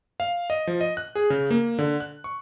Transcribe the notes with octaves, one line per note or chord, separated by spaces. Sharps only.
F5
D#5
F3
D#5
F#6
G#4
C#3
A#3
D3
F#6
C#6